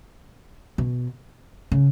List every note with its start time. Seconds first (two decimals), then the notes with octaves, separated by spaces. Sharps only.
0.78 B2
1.72 C#3